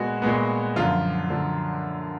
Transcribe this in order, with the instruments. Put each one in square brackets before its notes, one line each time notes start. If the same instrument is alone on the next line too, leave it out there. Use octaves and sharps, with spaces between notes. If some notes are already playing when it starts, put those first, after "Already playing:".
Already playing: [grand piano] A#2 G#3 B3 F#4
A#2 G#3 B3
F#2 D3 F3 F4
D3 F3